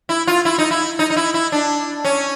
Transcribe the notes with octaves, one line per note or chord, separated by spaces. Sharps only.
E4
F4
E4
D#4
E4
D#4
D#4
E4
E4
D4
C#4